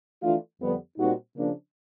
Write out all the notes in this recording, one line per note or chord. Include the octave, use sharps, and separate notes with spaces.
E3 A3 D4 F4
F2 D3 G3 B3
A#2 G3 C4 D#4 F#4
C#3 F3 A#3 D4